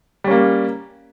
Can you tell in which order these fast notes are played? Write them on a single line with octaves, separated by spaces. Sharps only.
G3 C#4 A#3